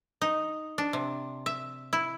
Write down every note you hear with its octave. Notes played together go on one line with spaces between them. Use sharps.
D#4
D4
C3
E5
E4